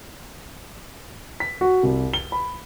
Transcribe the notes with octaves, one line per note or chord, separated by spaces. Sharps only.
B6
F#4
C2
G7
B5